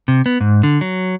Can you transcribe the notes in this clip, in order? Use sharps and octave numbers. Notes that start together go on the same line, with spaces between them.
C3
B3
G#2
D3
F#3